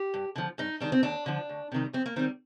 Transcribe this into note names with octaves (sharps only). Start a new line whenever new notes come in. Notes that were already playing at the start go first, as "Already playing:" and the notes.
Already playing: G4
G2
D3 F3
G2 D#4
D#3 G3 D4
C4
D#2 D4
D3 F3
D2
C3 D#3 G3
F2 C4
A#3
D#3 G3 C4